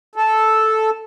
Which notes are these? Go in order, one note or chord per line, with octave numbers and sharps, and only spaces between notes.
A4